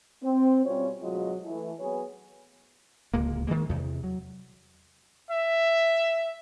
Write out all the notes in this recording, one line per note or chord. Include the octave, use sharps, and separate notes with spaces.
C4
B2 G3 C#4 F4 C#5
D2 B2 F#3 G#3 F4 D#5
E3 A3
F#3 B3 G#4 B4 C#5
D1 C#2 G#3 A#3
D#3 F#3 G#3 A#3
E2 C3
F#3
E5